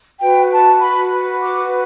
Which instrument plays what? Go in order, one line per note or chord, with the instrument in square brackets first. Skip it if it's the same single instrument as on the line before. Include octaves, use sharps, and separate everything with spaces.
[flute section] F#4 B4 G5
A5
B5
D6